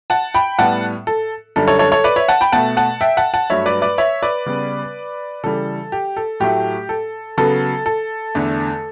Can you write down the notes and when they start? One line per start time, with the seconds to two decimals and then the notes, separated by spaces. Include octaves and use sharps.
0.10 F#5 A5
0.34 G5 B5
0.59 A2 G3 B3 F#5 A5
1.07 A4
1.56 F#2 D3 G3 A4
1.68 A4 C#5
1.79 A4 C#5
1.92 A4 C#5
2.04 B4 D5
2.16 C#5 E5
2.28 F#5 A5
2.41 G5 B5
2.52 B2 A3 F#5 A5
2.77 F#5 A5
3.01 E5 G5
3.17 F#5 A5
3.34 F#5 A5
3.50 G2 F#3 A3 C#5 E5
3.66 B4 D5
3.82 B4 D5
3.98 C#5 E5
4.23 B4 D5
4.46 C#3 G3 B3
5.44 C#3 E3 G3 A4
5.92 G4
6.17 A4
6.40 A2 F#3 A3 G4
6.89 A4
7.38 C#3 F#3 B3 A4
7.86 A4
8.35 E2 D3 A3